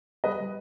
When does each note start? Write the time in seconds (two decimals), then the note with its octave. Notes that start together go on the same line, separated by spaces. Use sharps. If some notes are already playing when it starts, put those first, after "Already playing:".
0.24 G3 B4 D#5
0.40 G3